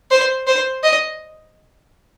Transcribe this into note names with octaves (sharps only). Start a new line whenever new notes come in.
C5
C5
D#5